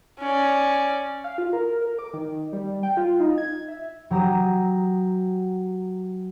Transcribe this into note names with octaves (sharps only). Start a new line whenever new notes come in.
C#4 D5
F5
F4
A#4
A#4
D6
D#3
G3
G5
F4
D#4
G#6
E5
F#3 G4 A#5 D#6 E7